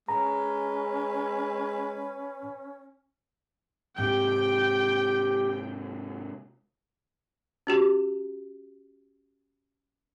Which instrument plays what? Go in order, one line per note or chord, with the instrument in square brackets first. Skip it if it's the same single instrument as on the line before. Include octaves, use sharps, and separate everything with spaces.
[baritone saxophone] G#3 [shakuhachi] C#4 [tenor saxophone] B4 [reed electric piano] A#5
[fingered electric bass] G#2 C3 [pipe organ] G4 [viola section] G5
[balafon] C#4 F#4 G4